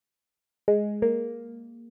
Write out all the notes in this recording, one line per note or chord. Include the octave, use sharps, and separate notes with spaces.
G#3
A#3